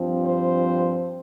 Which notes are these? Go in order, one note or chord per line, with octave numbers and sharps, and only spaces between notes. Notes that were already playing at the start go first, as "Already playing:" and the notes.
Already playing: G2 F3 C4
C5